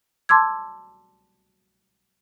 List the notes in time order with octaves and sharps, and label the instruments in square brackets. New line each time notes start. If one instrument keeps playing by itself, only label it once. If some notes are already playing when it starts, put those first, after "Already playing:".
[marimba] A5 C6 D6 E6 G#6